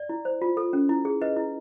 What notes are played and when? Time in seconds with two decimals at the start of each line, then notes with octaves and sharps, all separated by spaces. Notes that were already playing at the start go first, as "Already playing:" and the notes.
Already playing: D5
0.09 E4
0.25 C5
0.42 F4
0.57 A4
0.73 C#4
0.89 E4
1.05 G#4
1.21 B4 D#5
1.36 E4